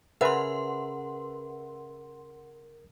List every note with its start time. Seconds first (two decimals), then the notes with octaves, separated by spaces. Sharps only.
0.21 C#3 A#4 B4 E5 F#5 C6